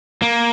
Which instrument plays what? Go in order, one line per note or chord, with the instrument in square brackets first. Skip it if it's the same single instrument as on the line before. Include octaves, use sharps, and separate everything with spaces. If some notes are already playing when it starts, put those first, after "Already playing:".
[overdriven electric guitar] A#3